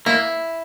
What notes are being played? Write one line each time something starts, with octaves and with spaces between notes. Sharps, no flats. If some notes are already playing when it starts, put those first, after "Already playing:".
A#3 E4